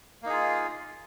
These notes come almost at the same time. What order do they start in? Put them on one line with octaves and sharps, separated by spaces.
A#3 D#4 G#4 F4